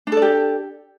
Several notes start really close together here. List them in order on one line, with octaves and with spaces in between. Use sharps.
D4 A4 D5 G4